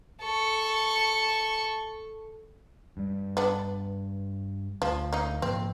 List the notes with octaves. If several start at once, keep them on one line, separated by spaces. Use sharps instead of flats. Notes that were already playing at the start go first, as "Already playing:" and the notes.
A4 C#6
G2 G3
B3 D4
D2 F3
A#3 D#4
G#2 F3 A#3 C4